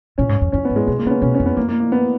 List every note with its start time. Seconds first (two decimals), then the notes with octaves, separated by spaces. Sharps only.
0.18 A#2 C#4
0.29 G#2
0.41 F2
0.52 F2 C#4
0.65 B3
0.70 G#2
0.76 G#3
0.87 B2 G#3
0.99 A#3
1.05 C#3 B3
1.10 C#4
1.22 B2 C#4
1.34 C#4
1.40 F2
1.46 B3
1.57 F#2 A#3
1.68 A#3
1.80 A#3
1.92 B3